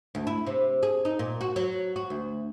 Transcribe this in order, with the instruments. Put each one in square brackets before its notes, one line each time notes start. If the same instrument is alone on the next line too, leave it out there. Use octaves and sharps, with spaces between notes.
[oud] D2
E4
C3
G#4
D#4
A#2
F#4
F#3
F#4
D2